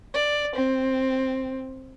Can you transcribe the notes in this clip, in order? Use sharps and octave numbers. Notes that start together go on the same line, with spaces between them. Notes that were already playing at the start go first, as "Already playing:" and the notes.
D5
C4